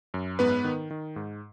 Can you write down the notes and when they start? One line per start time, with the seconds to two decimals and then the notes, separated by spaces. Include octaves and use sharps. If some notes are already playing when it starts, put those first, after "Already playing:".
0.14 F#2
0.39 G#2 B3 B4
0.65 D#3
0.91 D#3
1.16 G#2